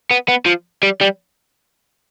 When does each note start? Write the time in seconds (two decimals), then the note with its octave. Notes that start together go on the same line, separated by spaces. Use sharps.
0.11 B3
0.28 B3
0.46 F3
0.83 G3
1.01 G3